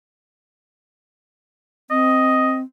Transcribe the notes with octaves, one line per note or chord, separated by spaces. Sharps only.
C4 D#5